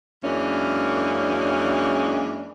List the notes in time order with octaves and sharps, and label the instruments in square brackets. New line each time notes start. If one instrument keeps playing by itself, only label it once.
[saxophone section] F#2 E3 G#3 A#3 C#4 D4